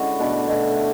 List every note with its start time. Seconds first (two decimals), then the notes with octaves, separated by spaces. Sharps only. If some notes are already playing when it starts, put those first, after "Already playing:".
Already playing: D3 G#3 C#4 E4 F#4
0.19 B2 A3 B3 D4
0.48 B2 A3
0.76 A3